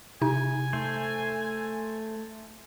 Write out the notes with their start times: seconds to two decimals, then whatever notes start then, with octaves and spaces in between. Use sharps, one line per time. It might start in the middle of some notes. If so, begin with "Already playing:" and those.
0.21 C3 D#4 G#5
0.73 A3 C5